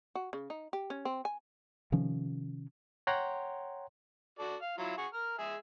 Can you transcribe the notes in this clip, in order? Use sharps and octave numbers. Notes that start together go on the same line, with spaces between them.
F#4
C#3
D#4
G4
C#4
C4
G#5
C3 D#3 F3 C#4
C#5 F#5 G5 A#5 C6
F#4 A4 D5
F5
F#3 E4 F4
G#4 F#5 C#6
A#4 F6
G#3 G#4 E5